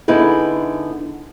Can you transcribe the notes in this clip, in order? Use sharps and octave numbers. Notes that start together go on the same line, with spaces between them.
D3 B3 D#4 E4 G#4